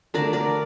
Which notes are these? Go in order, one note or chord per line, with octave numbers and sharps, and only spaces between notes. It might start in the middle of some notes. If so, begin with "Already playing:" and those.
D3 A3 A#4 D5
A#4 D5